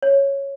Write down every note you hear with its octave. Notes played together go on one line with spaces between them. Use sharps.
C#5